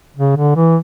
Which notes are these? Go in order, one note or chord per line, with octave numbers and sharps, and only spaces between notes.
C#3
D3
E3